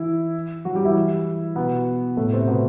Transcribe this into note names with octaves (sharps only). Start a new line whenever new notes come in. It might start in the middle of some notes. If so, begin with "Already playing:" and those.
Already playing: E3 E4
F#3 F#4
G3 G4
E3 E4
B2 B3
A2 A3
C3 C4
B2 B3